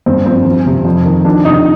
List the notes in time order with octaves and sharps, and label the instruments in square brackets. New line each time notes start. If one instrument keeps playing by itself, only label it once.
[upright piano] G2 C4
F3 C4
F3
C3
F2
D#3
F3 D4
C3 D#4